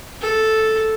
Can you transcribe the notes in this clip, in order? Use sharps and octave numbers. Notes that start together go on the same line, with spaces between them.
A4